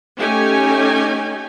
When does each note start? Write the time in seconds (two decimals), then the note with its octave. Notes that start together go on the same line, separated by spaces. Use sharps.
0.18 A3 C#4 D#4 G4 G5 G#5